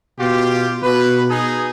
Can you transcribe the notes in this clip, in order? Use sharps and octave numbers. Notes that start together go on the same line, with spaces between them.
B2 F4 G4
B2 B4
D#4 G#4